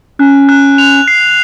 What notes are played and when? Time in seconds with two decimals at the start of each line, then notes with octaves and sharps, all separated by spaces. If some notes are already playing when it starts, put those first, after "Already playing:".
0.19 C#4 F#6
0.49 F#6
0.78 F7
1.08 C7